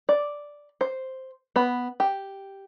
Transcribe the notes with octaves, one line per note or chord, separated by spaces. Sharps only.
D5
C5
B3 B5
G4